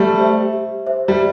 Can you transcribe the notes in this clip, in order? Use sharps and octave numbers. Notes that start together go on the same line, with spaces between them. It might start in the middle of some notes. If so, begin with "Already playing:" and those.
Already playing: G3 A3 G4
C5 E5
G4
C5 E5
G3